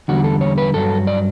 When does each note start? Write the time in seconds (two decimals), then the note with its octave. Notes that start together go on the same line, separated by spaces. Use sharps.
0.08 E2 D3 G3 F#4
0.24 A4
0.41 C#5
0.58 B4
0.74 G2 F#3 A4
1.07 D5